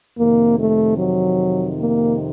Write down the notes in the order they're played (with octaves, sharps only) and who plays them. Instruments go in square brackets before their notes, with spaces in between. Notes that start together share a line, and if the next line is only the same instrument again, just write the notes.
[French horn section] F2 C3 D#3 A#3
A3
F#3
A#3